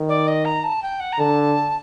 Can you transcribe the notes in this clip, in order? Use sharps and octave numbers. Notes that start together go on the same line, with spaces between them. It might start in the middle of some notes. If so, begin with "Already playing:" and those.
Already playing: D#3
D5
D#5
A#5
A5
G5
F#5
A#5
D3 A5